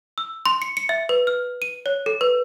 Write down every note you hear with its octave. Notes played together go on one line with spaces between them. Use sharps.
E6
C6
C#7
C#7
E5
B4
F6
D#7
C#5
A4
B4